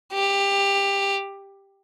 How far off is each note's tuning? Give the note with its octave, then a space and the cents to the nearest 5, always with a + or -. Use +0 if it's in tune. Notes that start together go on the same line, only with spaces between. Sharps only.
G4 +20